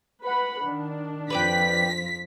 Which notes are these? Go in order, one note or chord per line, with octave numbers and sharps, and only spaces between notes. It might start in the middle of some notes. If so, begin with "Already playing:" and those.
B4 F#5 B5
D#3 D4
F2 F3 B4 D5 G5 B6